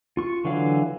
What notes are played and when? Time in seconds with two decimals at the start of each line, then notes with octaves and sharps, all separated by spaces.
0.17 F4 C#6
0.45 D3 E3 F#3 F5